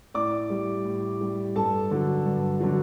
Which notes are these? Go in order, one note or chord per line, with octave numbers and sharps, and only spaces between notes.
A2 D5 D6
G3
A2
G3
G2 A4 A5
D3 F#3
G2
D3 F#3